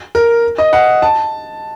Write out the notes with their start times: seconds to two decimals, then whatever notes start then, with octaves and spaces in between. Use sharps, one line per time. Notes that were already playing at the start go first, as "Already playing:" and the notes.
0.15 A#4
0.58 D#5
0.73 F#5
1.02 A5